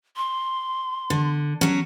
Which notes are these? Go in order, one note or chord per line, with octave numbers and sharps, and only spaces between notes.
C6
D3
F#3 C#4